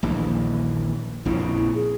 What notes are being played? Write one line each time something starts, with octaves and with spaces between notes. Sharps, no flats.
A#1 D#2 E3
A#1 F2 C#3 E4
G#4